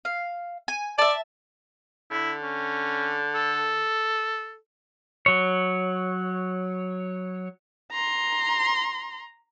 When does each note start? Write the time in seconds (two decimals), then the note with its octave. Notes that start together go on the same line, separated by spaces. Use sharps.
0.05 F5
0.68 G#5
0.98 D5 E5 A5
2.11 D3 E4
2.42 C#4
3.35 A4
5.26 F#3 C#5
7.92 A#5 C6